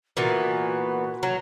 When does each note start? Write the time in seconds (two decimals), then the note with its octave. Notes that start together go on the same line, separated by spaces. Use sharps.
0.17 A#2 E3 B3 F#4
1.23 F#3